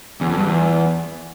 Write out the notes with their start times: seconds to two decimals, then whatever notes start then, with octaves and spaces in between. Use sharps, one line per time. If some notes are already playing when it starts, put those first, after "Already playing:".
0.21 E2
0.30 F2
0.38 G2
0.46 E2